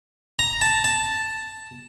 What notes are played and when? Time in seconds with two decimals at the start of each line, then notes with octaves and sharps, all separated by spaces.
0.39 A#5
0.61 A5
0.84 A5